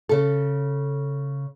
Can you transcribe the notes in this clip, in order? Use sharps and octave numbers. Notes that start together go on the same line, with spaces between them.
C#3 A4